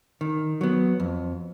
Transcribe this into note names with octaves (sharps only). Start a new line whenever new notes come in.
D#3
F#3 B3
F2